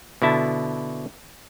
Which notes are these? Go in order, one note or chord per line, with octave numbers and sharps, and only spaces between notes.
B2 D3 E4 A5